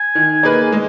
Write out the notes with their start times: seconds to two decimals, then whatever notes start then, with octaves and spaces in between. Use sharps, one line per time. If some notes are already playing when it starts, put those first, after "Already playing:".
Already playing: G#5
0.15 D#3
0.43 A#3 D#4 G#4 B4
0.72 G#3